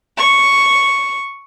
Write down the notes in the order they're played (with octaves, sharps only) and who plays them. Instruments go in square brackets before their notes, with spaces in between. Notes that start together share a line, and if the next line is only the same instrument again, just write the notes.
[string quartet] C#6